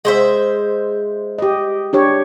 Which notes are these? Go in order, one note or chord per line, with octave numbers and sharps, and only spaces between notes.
G#3 C5 E5
G4 D#5
D4 G4 C#5